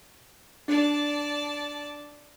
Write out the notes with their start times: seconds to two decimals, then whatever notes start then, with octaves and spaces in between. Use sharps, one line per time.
0.68 D4 D5 A5